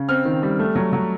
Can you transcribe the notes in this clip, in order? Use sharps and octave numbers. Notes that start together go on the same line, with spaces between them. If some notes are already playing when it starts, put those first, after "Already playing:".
Already playing: C#3
C4 F6
D#3
G3
A3
F#3
F#3